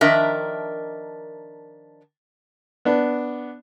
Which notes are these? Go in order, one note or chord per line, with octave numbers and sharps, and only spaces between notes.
D#3 F3 D4 A#4 D#5 E5
B3 D4